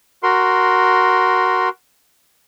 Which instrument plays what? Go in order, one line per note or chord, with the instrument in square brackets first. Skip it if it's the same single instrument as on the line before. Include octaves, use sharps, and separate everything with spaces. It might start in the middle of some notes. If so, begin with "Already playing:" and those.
[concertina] F#4 A#4 C6